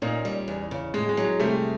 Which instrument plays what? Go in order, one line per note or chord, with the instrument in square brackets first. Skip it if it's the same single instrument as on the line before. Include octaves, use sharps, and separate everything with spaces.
[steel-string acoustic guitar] A#2 [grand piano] C#4 D#4
[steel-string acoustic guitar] G3
E2
C#3
[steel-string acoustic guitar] A2 [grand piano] G#3
[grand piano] G#3
[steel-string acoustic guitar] F#3
[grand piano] G#3
[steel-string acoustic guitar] C3 [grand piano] G3 A3